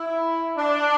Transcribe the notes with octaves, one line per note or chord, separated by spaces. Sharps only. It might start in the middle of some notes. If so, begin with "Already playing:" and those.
Already playing: E4
D4